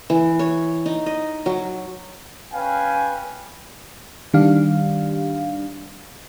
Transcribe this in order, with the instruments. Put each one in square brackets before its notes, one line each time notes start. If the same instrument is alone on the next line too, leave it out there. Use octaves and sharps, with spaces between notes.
[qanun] E3
C#5
D#4
D#5
F#3
[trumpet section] C#4 B4 F5 G5 G#5
[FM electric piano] D#3 G3 D4 G4 F5